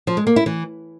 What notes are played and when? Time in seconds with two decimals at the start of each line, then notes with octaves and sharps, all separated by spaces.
0.07 F3
0.17 G#3
0.27 A#3
0.36 E4
0.46 E3